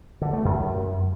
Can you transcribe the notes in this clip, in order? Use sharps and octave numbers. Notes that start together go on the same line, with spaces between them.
D3
A3
F#2